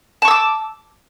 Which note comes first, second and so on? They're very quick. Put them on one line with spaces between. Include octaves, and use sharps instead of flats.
A5 C#6 E6 D6